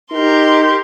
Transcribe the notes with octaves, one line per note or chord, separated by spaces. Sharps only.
D#4 G4 A#4 C6